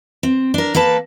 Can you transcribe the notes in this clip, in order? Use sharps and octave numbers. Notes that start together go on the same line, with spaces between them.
C4
D4 A#4
A#3 A4 B4 A5